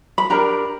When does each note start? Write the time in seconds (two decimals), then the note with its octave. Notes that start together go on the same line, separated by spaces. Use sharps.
0.18 B5
0.30 D4 G4 A#4 A#5